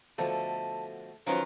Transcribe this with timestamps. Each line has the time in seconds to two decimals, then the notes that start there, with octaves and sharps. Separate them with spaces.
0.18 B2 D3 F3 A3 A5
1.27 F#2 D#3 F3 C#4 F4 B4